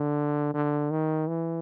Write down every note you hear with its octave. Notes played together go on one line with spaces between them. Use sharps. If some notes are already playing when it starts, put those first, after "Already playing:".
Already playing: D3
D3
D#3
E3